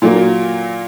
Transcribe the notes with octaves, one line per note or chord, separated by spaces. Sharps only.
A#2 F#3 A#3